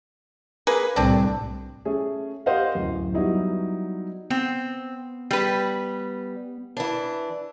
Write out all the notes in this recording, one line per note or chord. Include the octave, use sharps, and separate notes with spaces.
A#3 G#4 B4
C2 A2 D3 C4 D4
A3 C#4 G#4
G4 A#4 C5 D#5 F5 F#5
D1 F#2
F#3 G3 B3 D#4 E4
B3 C4
G3 B4
E3 D4